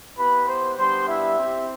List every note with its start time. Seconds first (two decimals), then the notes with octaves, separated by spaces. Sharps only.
0.17 B3 E4 G4 B4 B5
0.47 C5 C6
0.77 G3 B3 D4 G4 C5 C6
1.08 E4 E5
1.39 C4 E4 G4